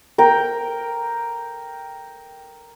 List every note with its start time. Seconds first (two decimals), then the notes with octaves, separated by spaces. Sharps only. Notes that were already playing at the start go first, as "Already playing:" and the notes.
0.18 A#4 G5